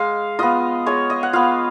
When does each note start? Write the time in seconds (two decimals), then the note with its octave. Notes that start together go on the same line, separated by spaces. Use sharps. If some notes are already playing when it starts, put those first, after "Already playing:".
Already playing: G#3 F5
0.39 B3 F4 D#5
0.86 G#3 C#5
1.10 D#5
1.23 F#5
1.33 B3 F4 F5